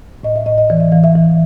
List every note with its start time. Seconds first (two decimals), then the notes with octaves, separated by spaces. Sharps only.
0.23 A2 D#5
0.36 E5
0.46 A2 D#5
0.58 D#5
0.69 E3 D5
0.80 E5
0.92 E3 F5
1.04 E5
1.15 E3